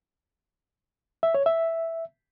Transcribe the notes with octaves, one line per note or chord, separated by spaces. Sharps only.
E5
C#5
E5